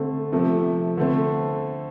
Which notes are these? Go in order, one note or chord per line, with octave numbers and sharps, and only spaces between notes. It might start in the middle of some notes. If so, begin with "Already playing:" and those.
Already playing: D3 A3 C4
C3 F3 A3
D3 A3 C4